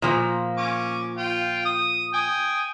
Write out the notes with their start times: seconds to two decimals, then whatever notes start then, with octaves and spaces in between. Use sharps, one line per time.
0.02 A#2 F3 A#3
0.57 C#4 D6
1.18 F4 G5
1.65 D#6
2.14 G5 G#5 D#6